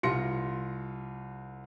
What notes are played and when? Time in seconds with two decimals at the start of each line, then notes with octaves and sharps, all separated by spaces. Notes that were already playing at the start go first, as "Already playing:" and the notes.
0.03 C2 F4 C6 A#6 C#7